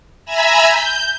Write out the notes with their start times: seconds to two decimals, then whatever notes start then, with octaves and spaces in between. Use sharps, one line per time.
0.25 E5 G#5 A#5 B5 E6
0.67 G6